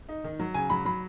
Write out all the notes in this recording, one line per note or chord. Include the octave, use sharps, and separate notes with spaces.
D#4
D#3
F#3
C#3 G#5
F#3 B5
F#3 B5